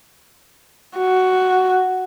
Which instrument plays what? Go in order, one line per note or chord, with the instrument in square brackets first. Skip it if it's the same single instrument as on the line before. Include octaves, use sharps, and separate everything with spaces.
[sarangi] F#4